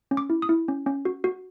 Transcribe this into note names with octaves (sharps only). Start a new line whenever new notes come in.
C#4
D6
E4
D#6
E4
C#4
C#4
F#4
F#4